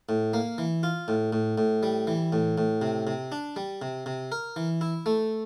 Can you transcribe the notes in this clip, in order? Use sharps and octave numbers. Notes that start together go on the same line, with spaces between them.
A2
A#3
E3
F4
A2
A2
A2
G3
E3
A2
A2
C3
C3
D4
G3
C3
C3
A#4
E3
E4
A3